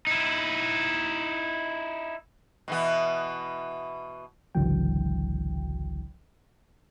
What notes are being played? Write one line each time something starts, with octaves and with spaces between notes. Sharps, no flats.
D#4 E4
B2 E3 B3
G#1 C#2 D3 E3 F#3 G5